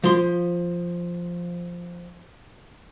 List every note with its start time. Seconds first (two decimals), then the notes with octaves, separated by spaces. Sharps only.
0.04 F3 C6